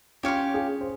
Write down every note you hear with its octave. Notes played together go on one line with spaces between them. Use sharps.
C#4 F4 G4 C#5 F5 C6
F4 G#4
C5